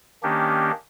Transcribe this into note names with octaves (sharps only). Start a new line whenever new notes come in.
D#3 A#3 C#4 D4 G4